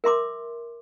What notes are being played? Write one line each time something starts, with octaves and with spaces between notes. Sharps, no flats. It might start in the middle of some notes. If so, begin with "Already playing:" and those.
A#4 E5 C6 D6